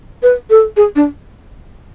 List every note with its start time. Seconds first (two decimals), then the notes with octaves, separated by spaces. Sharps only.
0.23 B4
0.50 A4
0.77 G#4
0.96 D4